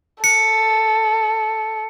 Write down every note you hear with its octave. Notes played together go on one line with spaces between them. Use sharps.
A4 C#7